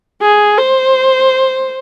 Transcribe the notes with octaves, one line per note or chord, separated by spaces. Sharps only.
G#4
C5